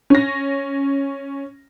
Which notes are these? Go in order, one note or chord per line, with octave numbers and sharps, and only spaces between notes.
C#4 A#6